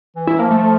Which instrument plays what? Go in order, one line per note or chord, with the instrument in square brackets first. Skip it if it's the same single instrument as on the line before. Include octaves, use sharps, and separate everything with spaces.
[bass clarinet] E3
[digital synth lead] E4
[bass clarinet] F3 [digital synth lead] A#3
[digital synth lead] A3
[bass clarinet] F3